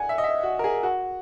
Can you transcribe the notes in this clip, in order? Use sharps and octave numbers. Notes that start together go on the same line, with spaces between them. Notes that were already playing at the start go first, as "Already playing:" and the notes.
Already playing: F#5 G#5
E5
D#5
E5
F#4
A#4
G#4
F#4